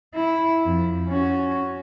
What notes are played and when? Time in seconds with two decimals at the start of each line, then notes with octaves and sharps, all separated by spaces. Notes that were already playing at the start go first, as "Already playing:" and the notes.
0.14 E4
0.65 F2
1.08 C#4 F#4